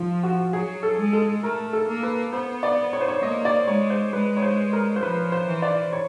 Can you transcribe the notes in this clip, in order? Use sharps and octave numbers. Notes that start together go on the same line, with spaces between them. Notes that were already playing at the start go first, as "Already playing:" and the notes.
Already playing: F3 F4
F#4
F#3 G#4
A4
G#3
A4
A3 A#4
A4
A#3
B4
B3 C5
D5
C#5
C5
C#5
A#3 D#5
D5
G#3 C#5
C5
G#3 B4
C#5
C5
A#4
C5
F3 B4
C5
E3
D5
C#5